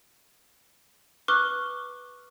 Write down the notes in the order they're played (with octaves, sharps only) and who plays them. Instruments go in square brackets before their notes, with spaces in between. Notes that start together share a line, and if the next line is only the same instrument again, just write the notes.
[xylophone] B4 C#6 D6 F6 F#6 G7